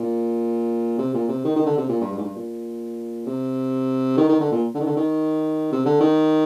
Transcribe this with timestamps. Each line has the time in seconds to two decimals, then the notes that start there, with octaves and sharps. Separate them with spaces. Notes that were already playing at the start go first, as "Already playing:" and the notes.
Already playing: A#2
0.98 C3
1.14 A#2
1.29 C3
1.45 D#3
1.56 D#3
1.66 D3
1.78 C3
1.89 A#2
2.01 G2
2.12 G2
2.18 G#2
2.24 G2
2.36 A#2
3.27 C3
4.17 D#3
4.29 D#3
4.40 D3
4.52 A#2
4.75 D3
4.80 D#3
4.86 D3
4.97 D#3
5.72 C3
5.86 D3
6.00 D#3